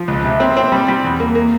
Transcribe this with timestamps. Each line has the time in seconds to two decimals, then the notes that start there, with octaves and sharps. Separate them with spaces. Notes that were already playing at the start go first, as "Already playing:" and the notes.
Already playing: F3
0.08 C#2
0.25 C3
0.40 C4
0.57 C4
0.72 G3
0.88 G3
1.04 E2
1.20 A#3
1.35 A#3